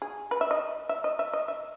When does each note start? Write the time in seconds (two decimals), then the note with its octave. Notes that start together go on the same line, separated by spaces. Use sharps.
0.02 G#4
0.31 B4
0.41 E5
0.51 D#5
0.89 E5
1.04 D#5
1.19 E5
1.33 D#5
1.48 E5